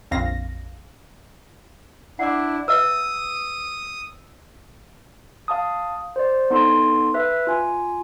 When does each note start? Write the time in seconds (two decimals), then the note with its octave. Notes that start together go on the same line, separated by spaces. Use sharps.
0.11 A#1 F2 F5 A#6
2.19 D4 E4 F#5 D6
2.68 B4 E5 D#6 E6
5.48 F5 A5 D#6
6.16 C5 D5
6.50 B3 D#4 A4 C6
7.14 B4 E5
7.47 F4 G#5